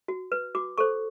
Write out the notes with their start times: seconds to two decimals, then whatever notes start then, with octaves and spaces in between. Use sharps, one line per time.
0.08 F#4
0.32 B4
0.55 F#4 D6
0.78 A4 C5 C#6